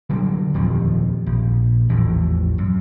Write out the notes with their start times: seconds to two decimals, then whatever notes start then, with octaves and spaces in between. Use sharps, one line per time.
0.09 D3 F#3 G3
0.54 D#1 F2 D#3 F3
1.26 A#1
1.89 A1 E2 A2 F3
2.58 F#2